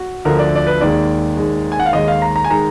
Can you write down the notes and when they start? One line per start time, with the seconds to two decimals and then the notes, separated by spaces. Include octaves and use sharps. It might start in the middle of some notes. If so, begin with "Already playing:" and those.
Already playing: F#4
0.25 D2 D3 F3 A#4
0.39 D5
0.56 D5
0.67 B4
0.81 D#2 D#3 G#3 D5
1.37 D#2 D#3 G#3
1.72 G#5
1.80 F#5
1.86 F5
1.93 D#2 D#3 G#3 D#5
2.08 F5
2.22 A#5
2.36 A#5
2.44 G#5
2.50 D#3 G#3 A#5